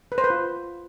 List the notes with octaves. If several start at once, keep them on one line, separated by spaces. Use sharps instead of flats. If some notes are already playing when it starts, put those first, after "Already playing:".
B4
C5
B4
F4